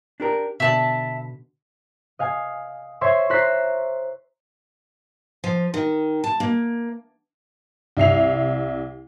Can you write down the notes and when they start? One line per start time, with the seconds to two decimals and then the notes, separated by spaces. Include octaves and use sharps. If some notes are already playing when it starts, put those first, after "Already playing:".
0.20 D4 G4 A#4
0.60 B2 D3 E5 A5 B5
2.19 D#5 F5 G#5
3.01 C5 C#5 E5 C6 C#6 G#6
3.30 C5 C#5 A#5 F#6 B6 C7
5.44 F3
5.74 D#3
6.24 A5
6.40 A#3
7.97 C2 E5 C7 F7